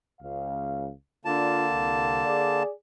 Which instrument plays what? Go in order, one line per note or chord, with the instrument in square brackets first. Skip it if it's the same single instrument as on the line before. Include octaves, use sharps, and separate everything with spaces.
[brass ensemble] C#2 F5
[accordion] D3 A#3 A5 [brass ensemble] D4 F4
[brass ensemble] C2
G#4 D5